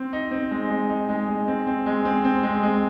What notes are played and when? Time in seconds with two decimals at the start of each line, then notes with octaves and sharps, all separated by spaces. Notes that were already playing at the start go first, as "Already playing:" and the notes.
Already playing: C4
0.13 D#4
0.31 C4
0.51 G#3
0.70 G#3
0.90 D#4
1.09 G#3
1.28 G#3
1.48 C4
1.67 C4
1.86 G#3
2.05 C4
2.25 C4
2.43 G#3
2.63 G#3